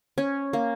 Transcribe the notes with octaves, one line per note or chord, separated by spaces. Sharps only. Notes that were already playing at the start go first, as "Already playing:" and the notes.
C#4
A#3